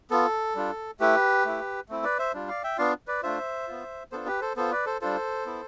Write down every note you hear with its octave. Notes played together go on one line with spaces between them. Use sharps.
B3 F4 A4
G3 D4 F4
A3 E4 G4 B4
A3 E4
A3 C4 E4
B4 D5
C5 E5
G3 D4 F4
D5 F5
E5 G5
B3 D4 F4 D5 F5
B4 D5
A3 D4 F4 C5 E5
B3 F4
B3 D4 F4 A4 C5
G4 B4
A4 C5
B3 F4 A4 C5
B4 D5
A4 C5
G3 D4 F4 A4 C5
B3 E4